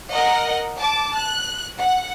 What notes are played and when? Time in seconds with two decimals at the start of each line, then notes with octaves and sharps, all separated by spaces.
0.12 A#4 D#5 F#5
0.78 A5 D6
1.15 F#6
1.79 F#5